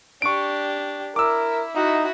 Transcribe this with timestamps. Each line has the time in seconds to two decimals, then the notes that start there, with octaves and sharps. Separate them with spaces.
0.22 D4 G4 C#6 D7
1.16 E4 A#4 D6 E6
1.75 D#4 E4 F#4